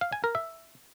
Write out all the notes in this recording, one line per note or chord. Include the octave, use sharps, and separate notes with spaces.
F5
G#5
A#4
E5